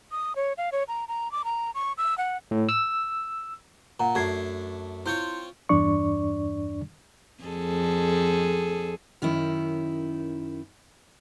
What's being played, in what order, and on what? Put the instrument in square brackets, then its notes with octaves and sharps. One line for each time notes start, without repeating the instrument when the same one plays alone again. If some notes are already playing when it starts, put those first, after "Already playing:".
[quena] D#6
C#5
F5
C#5
A#5
A#5
D6
A#5
C#6
E6
F#5
[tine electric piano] A2
E6
[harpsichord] A#2 [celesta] F#5 A#5
[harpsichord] F#2 A3 D4 [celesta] F#4 G#6 C7
[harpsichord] C4 F4 C#5 [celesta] E4 G6
[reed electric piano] E2 G2 D4 D5 C#6
[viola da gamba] F2 G#4 A4
[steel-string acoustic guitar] F#2 D#3 C#4 D#4 E4